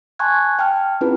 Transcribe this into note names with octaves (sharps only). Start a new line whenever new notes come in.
G#5 A5 C6 C#6 F#6 G#6
G5 A5 F6
C4 C#4 E4 F4 G#4 B4